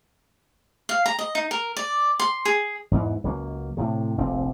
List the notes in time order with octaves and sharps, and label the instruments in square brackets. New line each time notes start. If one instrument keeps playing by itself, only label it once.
[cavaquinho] F5
A#5
D#5
D#4
A#4
D5
C6
G#4
[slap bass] E2 G#2 E3
C#2 F#3 A#3
A2 C3
F1 A#1 C4